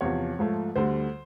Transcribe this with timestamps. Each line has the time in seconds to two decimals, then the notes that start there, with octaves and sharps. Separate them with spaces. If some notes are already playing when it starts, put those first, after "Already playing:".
0.01 E2 C3 F3 C#5
0.39 G#2 F3 A3
0.76 D2 D3 G3 C5